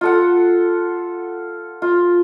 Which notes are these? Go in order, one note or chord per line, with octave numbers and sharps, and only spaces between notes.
F4 A4 F#5
F4